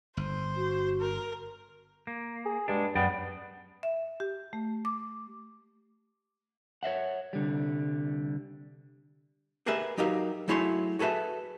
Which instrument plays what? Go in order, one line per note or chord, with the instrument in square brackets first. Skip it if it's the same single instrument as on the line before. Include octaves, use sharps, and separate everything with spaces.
[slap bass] G1 [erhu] C5
[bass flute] F#4
[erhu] A#4
[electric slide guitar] A#3
[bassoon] G#4
[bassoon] G2 [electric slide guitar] G#3 D4
[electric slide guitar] F#2 D5 G5 [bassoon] B3
[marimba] E5
G4
A3
D6
[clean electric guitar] C#5 D#5 E5 F#5
C2 D3 G3
[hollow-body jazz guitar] G4 G#4 A#4 B4 E5
F#3 D#4 G4 A#4 F5
F#3 A3 E4 G#4 C#5 C6
F#4 G#4 A4 B4 E5